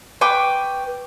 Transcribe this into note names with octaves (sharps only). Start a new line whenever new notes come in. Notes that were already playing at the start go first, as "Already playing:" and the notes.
B4 G5 C#6 D6